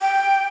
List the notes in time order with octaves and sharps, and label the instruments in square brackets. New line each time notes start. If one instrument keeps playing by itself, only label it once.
[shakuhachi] G5